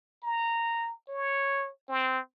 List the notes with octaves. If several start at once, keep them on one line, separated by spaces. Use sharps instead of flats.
A#5
C#5
C4